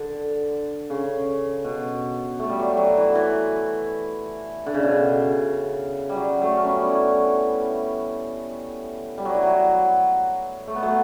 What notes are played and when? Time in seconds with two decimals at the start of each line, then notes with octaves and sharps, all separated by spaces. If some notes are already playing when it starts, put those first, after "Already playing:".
Already playing: D3
0.90 C#3
1.64 B2
2.40 A3
2.49 G3
2.59 F#3
2.69 G3
2.77 F#3
2.97 E3
3.15 E3
4.66 D3
4.74 C#3
4.83 B2
4.92 C#3
6.09 G3
6.16 F#3
6.42 F#3 A3
6.57 C#4
6.66 G3 B3
6.92 E3
9.18 G3
9.25 F#3
9.35 E3
9.42 F#3
10.68 A3
10.76 B3
10.83 F#3 A3